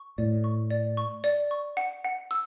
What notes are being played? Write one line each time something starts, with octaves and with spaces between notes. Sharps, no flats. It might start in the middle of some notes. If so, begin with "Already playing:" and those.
Already playing: C#6
A2 D5
C#6
D5
C#6
D5
C#6
F#5
F#5
E6